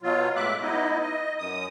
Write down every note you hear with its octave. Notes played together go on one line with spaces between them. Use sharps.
B2 F#3 F4
A2 G#3 E5 D6 F#6
B3 D#4 E4 D#5
D#5
F#2 D#6